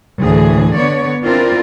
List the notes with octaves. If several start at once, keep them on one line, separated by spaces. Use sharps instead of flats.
D2 A2 E3 G#4
D3 B3 C#5 D5
C4 D4 E4 F4 A#4